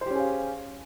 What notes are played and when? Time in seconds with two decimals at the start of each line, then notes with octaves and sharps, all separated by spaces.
0.01 C5
0.06 G4
0.10 C#4
0.15 G#4
0.20 F5